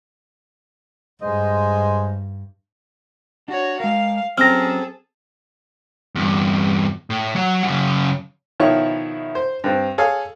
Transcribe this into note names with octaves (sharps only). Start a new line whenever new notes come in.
G2 G#3 C5 D#5
D4 F#4 C#5
G#3 A#4 F5
F#3 C4 C#4 G#4 A4 A#5 F6 A#6
E2 G2
A2
F#3 F#5
F#2 C#3
B2 D#3 F3 E4 C#5 C#6
C5
G2 C4
G#4 A4 C#5 F5